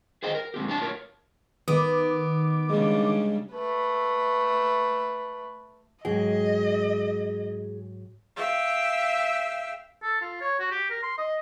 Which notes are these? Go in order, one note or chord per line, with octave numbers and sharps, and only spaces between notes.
G#4 C5 D#5 G5
A#4
G#3 C4 G4
A3 D4 C#5 A5
F4 A#4 C#5
D#3 B3 D6 D#6 D7
C#3 G3 G#3 D4
A3 B4
G#2 F#3 G#4 D#5 G5
E5 F5 G5
A4
F4
C#5
F#4
G4
A#4
C6
D#5